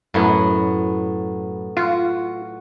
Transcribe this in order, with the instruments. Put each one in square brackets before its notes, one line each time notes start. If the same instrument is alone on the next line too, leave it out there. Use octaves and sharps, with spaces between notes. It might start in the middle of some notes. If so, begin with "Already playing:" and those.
[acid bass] F#2 [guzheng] A2 F#3 B3
[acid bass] F4 [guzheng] F#4